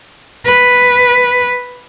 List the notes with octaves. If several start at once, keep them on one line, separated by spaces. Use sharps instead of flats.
B4